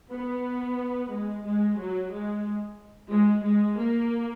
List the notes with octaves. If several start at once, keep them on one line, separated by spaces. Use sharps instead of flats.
B3
G#3
G#3
F#3
G#3
G#3
G#3
A#3